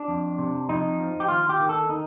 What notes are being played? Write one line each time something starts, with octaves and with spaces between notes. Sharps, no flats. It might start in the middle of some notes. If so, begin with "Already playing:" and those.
Already playing: D4
F2
C3
F2 D#4
F3
G4
D#2 F4
G4
D#3
A4
D#3 D#4